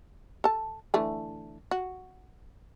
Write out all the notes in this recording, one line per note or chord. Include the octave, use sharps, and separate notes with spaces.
A4 A5
D3 E3 A3
F#4